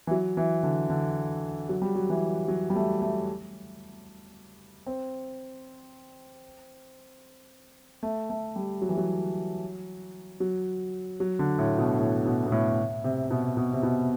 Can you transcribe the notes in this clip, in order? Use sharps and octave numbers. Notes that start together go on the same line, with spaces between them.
E3
F#3
E3
D3
D3
F#3
G3
F#3
E3
F#3
G3
A3
A3
C4
A3
A3
G3
F#3
E3
F#3
F#3
F#3
D3
A2
B2
A2
B2
B2
A2
C3
B2
B2
C3
B2